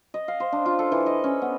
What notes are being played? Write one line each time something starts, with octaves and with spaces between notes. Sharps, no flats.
D#5
F5
C5
D4
F4
A4
E3
D#5
C#4
B3